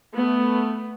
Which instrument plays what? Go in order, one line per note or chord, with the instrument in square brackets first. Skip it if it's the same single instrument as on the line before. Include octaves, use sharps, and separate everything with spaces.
[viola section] A3 B3